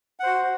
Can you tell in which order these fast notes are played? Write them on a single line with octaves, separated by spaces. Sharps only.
F#5 C5 F#4